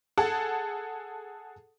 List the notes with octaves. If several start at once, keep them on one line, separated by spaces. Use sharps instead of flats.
G#4 A4 F#5 A5